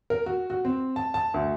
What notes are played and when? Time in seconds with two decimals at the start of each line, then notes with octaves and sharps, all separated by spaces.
0.10 A#4
0.26 F#4
0.50 F#4
0.65 C4
0.96 A5
1.14 A5
1.34 D2